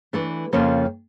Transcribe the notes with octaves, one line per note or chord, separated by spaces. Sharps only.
E3 A3 D4
F2 C#3 F3 A#3 C#4